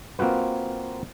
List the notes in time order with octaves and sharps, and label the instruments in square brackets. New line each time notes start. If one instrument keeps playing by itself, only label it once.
[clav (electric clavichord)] A#3 C4 F4 F#4 B4